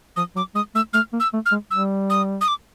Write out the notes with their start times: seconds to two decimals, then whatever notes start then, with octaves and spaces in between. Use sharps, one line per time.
0.16 F3 D#6
0.36 F#3 D6
0.55 G#3 D#6
0.75 A3 E6
0.93 A3 F6
1.13 A#3
1.20 E6
1.33 A3
1.46 F6
1.52 G#3
1.71 G3 E6
2.10 D#6
2.41 D#6
2.48 D6